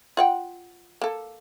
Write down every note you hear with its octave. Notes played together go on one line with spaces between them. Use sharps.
F4 F#5 G5
A#3 A4